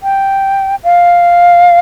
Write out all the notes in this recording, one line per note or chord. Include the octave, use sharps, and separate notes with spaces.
G5
F5